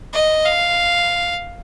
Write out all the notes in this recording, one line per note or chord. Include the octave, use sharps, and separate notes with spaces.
D#5
F5